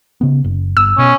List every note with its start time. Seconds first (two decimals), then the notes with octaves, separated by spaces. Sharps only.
0.21 C#3 B3
0.44 F#1
0.77 G1 E6
0.98 B2 C#4